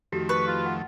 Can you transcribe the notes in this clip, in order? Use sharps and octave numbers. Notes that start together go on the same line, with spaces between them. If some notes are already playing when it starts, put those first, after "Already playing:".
F2 D#3 A3 F#4 G4 A4
B4 C#6
F4
F#5